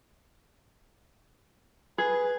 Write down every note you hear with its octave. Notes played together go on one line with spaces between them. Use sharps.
G#4 B4